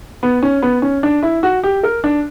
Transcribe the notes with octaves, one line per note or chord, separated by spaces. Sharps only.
B3
C#4
B3
C#4
D4
E4
F#4
G4
A#4
D4